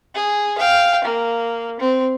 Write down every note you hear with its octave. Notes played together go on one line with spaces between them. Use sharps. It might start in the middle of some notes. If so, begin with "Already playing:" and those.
G#4
F5 G5
A#3
C4